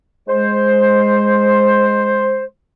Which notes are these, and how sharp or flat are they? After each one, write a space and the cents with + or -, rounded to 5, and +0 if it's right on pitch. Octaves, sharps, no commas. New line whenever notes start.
G#3 +0 C5 +5